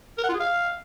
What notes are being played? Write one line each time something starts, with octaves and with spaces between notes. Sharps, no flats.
A#4
F#5
F4
G#4
F5